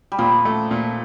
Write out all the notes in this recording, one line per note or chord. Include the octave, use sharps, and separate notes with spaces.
G3
A#2 F3
A3
A#2